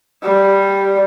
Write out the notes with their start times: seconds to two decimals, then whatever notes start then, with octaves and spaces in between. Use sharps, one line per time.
0.23 G3